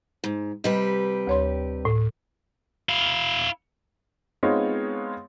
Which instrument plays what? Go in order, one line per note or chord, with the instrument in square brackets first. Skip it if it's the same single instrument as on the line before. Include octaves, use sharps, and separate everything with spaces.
[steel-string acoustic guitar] G#2
[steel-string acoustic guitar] C3 G3 B4 [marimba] D#5
[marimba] D2 C#5 C6
A2
[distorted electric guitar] E4 F5
[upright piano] G#3 B3 C4 D#4 F4 C#5